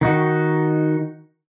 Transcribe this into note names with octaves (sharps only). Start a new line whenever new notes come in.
D#3 D#4 F#4